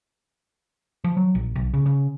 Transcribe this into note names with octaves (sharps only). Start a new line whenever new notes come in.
F3
F#3
A#1
B1
C#3
C#3